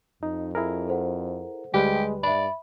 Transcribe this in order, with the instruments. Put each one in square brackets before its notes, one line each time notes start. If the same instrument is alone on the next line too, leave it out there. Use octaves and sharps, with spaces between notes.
[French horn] F2 [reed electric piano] D#4
[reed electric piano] E4 G#4 A#4
[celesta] A4 C5 F#5
[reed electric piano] D2 G3 B4 [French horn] G#3 [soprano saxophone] G4
[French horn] G2 [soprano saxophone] D5 [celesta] E5 B5